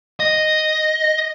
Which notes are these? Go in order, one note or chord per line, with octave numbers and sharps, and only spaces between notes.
D#5